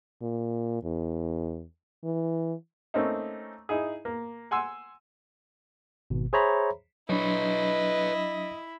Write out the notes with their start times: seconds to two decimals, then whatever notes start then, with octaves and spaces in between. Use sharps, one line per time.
0.22 A#2
0.83 E2
2.04 E3
2.94 A3 A#3 C4 C#4 D#4
3.69 D#4 E4 G#4
4.05 A#3
4.51 F#5 G#5 C6 E6
6.10 G#1 B2
6.33 G#4 C5 C#5 E5 A#5 B5
7.10 F#3 D4 E4 B4 C#5 D#5